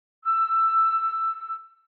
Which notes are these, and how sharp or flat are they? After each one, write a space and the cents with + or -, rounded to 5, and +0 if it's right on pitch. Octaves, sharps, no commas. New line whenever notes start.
E6 +10